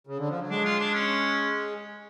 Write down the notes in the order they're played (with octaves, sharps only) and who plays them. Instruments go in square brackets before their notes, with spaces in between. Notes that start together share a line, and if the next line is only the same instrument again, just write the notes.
[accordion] C#3
D3
F3
F#3
[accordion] G#3 [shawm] D4
[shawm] F4
D4
C#4